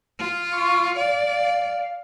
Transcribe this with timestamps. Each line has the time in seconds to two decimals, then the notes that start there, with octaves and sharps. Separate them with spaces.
0.19 F4
0.52 C#6
0.97 D5 F5